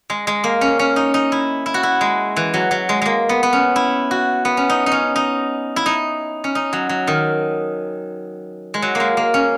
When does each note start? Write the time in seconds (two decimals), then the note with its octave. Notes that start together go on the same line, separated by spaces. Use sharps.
0.10 G#3
0.27 G#3
0.44 A#3
0.61 C#4
0.79 C#4
0.96 D#4
1.14 D#4
1.32 E4
1.66 E4
1.74 F#4
1.83 E4
2.01 G#3
2.36 E3
2.54 F#3
2.71 F#3
2.89 G#3
3.02 G#3 A#3
3.29 B3
3.43 B3
3.53 C#4
3.76 E4
4.11 F#4
4.45 B3
4.57 C#4
4.69 D#4
4.86 D#4
4.92 C#4
5.16 D#4
5.76 E4
5.86 D#4
6.44 C#4
6.55 D#4
6.73 F#3
6.89 F#3
7.07 D#3
8.74 G#3
8.82 F#3
8.95 G#3 A#3
9.17 A#3
9.34 C#4